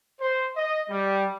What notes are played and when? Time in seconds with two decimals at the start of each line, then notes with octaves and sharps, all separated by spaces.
0.20 C5
0.56 D#5
0.90 G3